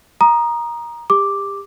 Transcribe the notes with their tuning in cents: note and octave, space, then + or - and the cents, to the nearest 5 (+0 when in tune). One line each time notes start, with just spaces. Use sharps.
A#5 +15 D#6 -20
G4 +30 D6 +0